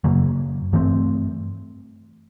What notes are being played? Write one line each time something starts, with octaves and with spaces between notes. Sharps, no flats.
F#2 C#3 F#3 A#3
G2 E3 A3 C4